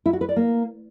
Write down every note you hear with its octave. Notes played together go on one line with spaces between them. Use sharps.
E4
F#4
B4
D5
A#3